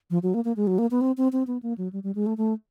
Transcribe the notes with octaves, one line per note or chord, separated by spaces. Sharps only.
F3
F#3
A#3
A#3
G#3
F#3
A#3
B3
C4
C4
C4
B3
A#3
F#3
G3
G3
G#3
A3
A3